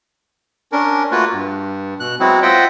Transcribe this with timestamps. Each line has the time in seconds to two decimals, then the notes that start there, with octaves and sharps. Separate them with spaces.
0.72 C#4 D4 A#4
1.11 A3 A#3 F4 F#4 B4
1.33 G2
2.00 B2 F#6
2.20 F#3 G#3 B3 C4 E4 F#4
2.42 F4 C5 D#5 E5 F#5 G5